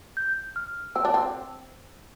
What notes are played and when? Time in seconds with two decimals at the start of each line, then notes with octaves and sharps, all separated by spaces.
0.17 G6
0.56 F6
0.95 C4 E6
1.05 D4
1.14 C4